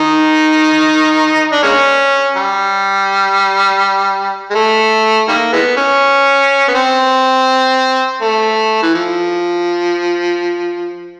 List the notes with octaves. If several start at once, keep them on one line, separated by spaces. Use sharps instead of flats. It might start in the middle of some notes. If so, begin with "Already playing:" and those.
Already playing: D#3 D#4
D4
G#3 A#3 C#4
G3
G#3
A3
D#3 G3 A#3
E3 G#3 B3
C#4
B3
C4
A3
E3
F3